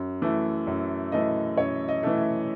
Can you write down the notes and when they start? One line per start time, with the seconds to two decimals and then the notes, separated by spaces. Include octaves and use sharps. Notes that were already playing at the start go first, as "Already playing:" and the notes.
Already playing: F#2
0.22 E3 A3
0.67 F#2
1.12 E3 A3 D#5
1.57 F#2 C#5
1.88 D#5
2.03 E3 A3
2.18 E5